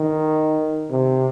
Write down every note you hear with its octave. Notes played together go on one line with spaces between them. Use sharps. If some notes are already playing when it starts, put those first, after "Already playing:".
Already playing: D#3
C3